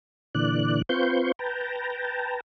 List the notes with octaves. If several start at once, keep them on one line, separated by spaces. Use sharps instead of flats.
A#2 D3 E3 D5 F#6
C4 F4 B4 C6 C#6 G6
B4 G5 A5 A#5